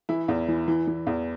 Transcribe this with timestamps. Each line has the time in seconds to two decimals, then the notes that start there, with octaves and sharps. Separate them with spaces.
0.09 E3 E4
0.28 E2
0.48 E3
0.68 E3
0.87 E3
1.07 E2